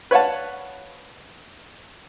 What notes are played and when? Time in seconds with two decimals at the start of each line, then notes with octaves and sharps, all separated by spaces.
0.11 B4 C#5 F5 F#5 A5